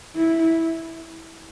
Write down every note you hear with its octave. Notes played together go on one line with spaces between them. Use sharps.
E4